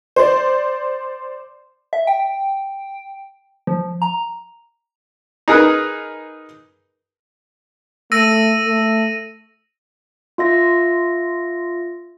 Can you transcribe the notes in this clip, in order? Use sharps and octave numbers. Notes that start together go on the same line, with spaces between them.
C5 D5
E5
G5
F3
A#5
D#4 G#4 A#4 B4
A3 E6 A#6 D#7
A3
F4 E5 A#6